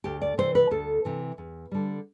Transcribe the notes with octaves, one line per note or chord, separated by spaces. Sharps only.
D2 G4
D5
C3 E3 C5
B4
D2 A4
C3 E3
E2
D3 G3